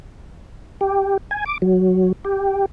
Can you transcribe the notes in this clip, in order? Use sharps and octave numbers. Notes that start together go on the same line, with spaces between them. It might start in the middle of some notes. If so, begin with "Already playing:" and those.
G4
G#5
D6
F#3
G4